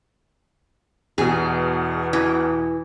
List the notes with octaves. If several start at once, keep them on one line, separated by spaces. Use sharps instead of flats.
E2 B2 G#4
E3